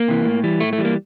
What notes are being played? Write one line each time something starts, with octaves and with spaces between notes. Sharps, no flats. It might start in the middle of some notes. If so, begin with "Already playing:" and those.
Already playing: A#3
C3 E3
A2
E3 G3
A2 A3
A3
E3 G3
A#3